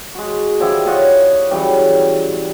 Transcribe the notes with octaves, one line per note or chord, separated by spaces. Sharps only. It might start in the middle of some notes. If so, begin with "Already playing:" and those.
G#3 F#4
D3 F3 E4 G4
F4 C#5 D#5 F#5
C#3 E3 F#3 G3